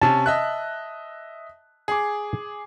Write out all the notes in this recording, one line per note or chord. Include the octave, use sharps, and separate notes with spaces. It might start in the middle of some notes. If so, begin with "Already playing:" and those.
C3 C#4 A5
D#5 E5 F#6
G#4 D6